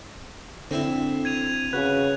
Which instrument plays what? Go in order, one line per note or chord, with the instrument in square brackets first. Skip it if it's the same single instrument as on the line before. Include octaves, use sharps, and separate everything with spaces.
[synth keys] D3 [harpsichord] C4 E4
[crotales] G#6 D#7 F7
[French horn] C#3 [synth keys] F#4 B4 [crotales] F#6